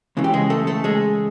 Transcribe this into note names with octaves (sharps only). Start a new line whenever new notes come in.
C#2 C#3 E3
G4
G#3 G#4
A3 A4
A3 A4
G#3 G#4